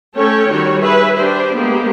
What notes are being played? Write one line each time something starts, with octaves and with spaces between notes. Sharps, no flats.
A3 C#4 A4 C#5 G5
D#3 G3 F#4 C#5
G#4 B4 E5
D4 G4 C5
G#3 A#3 B3 G4